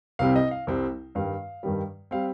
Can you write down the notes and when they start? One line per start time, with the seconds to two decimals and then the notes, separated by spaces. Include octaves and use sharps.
0.19 C2 C3 G3 C4 F5
0.36 D#5
0.51 F5
0.67 C2 C3 G3 C4
1.15 G2 D#3 G3 F5
1.63 G2 D#3 G3
2.11 G3 C4 F5